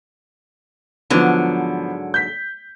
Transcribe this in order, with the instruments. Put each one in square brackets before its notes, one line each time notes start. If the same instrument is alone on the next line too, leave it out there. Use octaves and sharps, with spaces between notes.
[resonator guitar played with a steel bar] G#2 D3 F#3 [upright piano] F3 B3
[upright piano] G6 B6